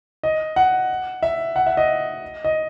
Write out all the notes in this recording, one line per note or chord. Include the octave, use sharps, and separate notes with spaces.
D#5
F#5
E5
F#5
E5
D#5
D#5